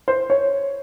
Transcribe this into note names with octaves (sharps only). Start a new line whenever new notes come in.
C5
C#5